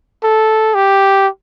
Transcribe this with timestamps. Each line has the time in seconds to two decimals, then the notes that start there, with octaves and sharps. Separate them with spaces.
0.24 A4
0.75 G4